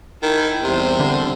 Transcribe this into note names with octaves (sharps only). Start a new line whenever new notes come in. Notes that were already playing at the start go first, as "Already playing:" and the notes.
D#3 E4
E2 C3 G3 C5
D3